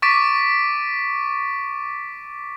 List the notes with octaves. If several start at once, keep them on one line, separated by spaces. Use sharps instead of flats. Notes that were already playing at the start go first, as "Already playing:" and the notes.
C#6 D6 A6 B6 D7